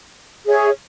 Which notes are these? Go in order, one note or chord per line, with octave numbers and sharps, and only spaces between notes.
G#4 C#5 E5